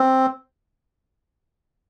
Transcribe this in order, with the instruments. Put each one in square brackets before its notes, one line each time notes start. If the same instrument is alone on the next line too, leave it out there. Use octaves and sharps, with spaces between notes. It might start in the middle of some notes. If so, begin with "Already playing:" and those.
Already playing: [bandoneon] C4